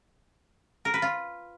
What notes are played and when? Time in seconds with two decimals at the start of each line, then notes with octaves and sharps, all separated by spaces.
0.85 A#4
0.94 B4
1.02 F4